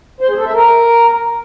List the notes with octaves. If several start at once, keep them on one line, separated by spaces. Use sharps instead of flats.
C5
G#4
A4
E5
A#4